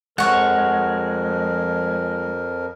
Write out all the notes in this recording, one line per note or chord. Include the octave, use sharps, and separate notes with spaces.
F2 F3 G#3 A#4 C#5 F#5